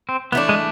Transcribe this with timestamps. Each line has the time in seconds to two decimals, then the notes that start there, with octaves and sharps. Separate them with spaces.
0.09 C4
0.32 E3 A3 B3 D4
0.49 G#3